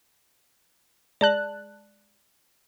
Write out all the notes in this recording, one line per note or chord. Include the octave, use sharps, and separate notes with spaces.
G#3 D5 A5 F#6